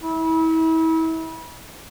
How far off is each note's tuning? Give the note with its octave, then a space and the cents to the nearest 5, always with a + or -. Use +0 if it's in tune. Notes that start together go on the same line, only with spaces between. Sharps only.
E4 -35